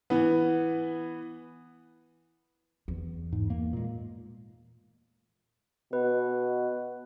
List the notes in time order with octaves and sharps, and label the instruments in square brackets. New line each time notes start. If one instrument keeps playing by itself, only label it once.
[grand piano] E3 B3
[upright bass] E2
[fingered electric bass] G#2
A#3
A#2 G#3
[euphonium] B2 [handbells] B4